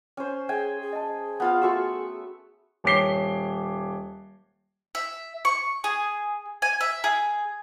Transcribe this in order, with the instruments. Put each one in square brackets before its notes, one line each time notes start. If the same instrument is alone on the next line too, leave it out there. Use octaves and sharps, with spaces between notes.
[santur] C#4 C5
[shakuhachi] G#4 [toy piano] E5 [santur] G5 G#5
[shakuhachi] G#4
[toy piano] D#5 A5
[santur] B3 F4 F5
[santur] A3 C#6 E6 [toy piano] F#4 C6
[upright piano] D#1 C#5 D6 C7 G7
[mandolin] E5
C#6
G#4
G#5
E5
G#4